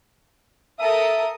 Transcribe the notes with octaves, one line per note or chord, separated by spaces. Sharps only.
A4 A#4 E5 D#6